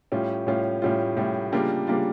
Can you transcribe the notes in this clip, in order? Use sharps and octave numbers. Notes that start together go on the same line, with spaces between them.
A2 G3 C#4 F4
A2 G3 C#4 F4
A2 G3 C#4 F4
A2 G3 C#4 F4
C#3 G3 A#3 D4 F4
C#3 G3 A#3 D4 F4